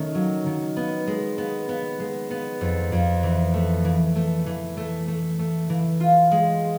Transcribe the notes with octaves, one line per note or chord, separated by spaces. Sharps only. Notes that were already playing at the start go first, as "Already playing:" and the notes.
Already playing: D#3 A3 C#4
F#3
D#3
B3
G#3
B3
B3
G#3
B3
F2
F2
E3
A3
E3
A3
E3
A3
A3
A3
E3
F4
G#3